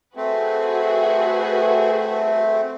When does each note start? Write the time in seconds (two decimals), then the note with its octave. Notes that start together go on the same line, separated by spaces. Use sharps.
0.16 A3 C4 F#4 G#4 B4